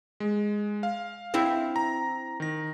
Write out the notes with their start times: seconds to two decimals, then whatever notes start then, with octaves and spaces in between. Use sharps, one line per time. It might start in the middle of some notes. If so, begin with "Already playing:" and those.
0.20 G#3
0.83 F5
1.34 C4 E4
1.76 A#5
2.40 D#3 A#6